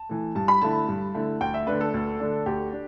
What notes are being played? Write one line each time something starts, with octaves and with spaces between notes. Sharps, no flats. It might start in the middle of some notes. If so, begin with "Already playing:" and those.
Already playing: A5
E3 A3
G2 A5
B5
D3 A3 E4 A5
G2
D3 A3 E4
D2 G5
E5
D3 A3 D4 B4
A4
D2
D3 A3 D4
D2 G4
D4